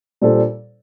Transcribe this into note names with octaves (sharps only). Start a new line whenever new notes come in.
A#2 G3 D4 A4 C5